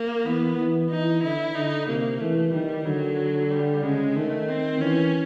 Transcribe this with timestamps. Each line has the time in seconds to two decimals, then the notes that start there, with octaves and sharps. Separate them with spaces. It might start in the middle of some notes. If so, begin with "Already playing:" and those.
Already playing: A#3
0.25 E3 B3
0.57 E3
0.90 E3 D#4
1.23 D3 E4
1.55 D3 D#4
1.88 C3 A#3
2.21 E3 A3
2.53 D#3 G3
2.85 D3 F#3
3.51 G3
3.83 C#3 G#3
4.16 D#3 A3
4.48 C4
4.81 E3 C#4